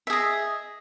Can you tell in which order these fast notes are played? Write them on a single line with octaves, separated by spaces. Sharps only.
E5 G#4 D#5